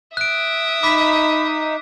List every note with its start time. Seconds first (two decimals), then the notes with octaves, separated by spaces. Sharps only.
0.17 E5 D#6 F#6 D7
0.83 D#4 B5 D6 B6